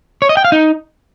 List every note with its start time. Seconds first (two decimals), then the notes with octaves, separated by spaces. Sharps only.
0.22 C#5
0.29 D#5
0.37 G5
0.45 F5
0.52 D#4